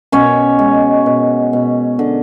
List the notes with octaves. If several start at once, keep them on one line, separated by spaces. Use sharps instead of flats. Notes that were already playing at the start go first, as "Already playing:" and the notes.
B2 C#4 C#5
G#3
B2
B2
D3